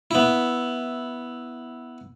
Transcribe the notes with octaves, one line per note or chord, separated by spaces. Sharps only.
B3 E4